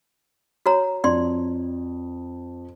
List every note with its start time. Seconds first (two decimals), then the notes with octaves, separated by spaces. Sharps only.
0.66 F#4 C#5 A#5
1.04 F2 D5 C6